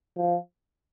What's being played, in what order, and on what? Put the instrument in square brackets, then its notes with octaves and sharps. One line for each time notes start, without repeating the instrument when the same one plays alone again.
[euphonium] F3